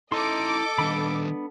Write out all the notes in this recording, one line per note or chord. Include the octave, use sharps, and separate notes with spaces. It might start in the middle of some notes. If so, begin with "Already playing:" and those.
D#4 E4 A4 D#5 A#5 C6 D6
D#3 G3 B3 D4 B5